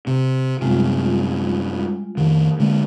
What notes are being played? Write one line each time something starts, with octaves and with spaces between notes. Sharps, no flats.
C3
F#2 C3 G3 G#3 F4
F2 D#3
D3 G#3 A#3